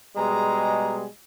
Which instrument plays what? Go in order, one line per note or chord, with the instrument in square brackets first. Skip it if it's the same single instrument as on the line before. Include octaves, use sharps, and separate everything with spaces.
[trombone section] B2 G3 G#3 [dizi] A#5